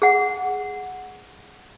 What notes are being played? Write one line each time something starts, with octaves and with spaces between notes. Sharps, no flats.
G#4 F#5